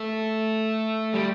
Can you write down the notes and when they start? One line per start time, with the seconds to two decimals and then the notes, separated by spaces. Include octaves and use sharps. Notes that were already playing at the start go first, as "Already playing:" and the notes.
Already playing: A3
1.14 G3